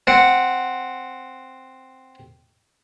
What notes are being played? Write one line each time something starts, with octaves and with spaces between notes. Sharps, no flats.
C4 F#5